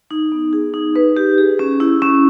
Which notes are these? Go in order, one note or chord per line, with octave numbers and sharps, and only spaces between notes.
D#4
B3
G#4
D#4
B4
G4
G#4
C#4
E4
C#4